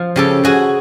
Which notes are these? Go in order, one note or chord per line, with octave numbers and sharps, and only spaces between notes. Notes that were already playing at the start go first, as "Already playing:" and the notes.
Already playing: F3
C#3 G4 A4
C#3 F#4 G#4